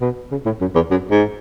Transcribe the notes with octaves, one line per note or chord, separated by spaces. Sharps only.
B2
C#3
A2
F#2
E2
F#2
G#2